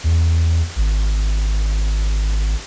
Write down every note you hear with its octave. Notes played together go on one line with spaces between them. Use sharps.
E2
G#1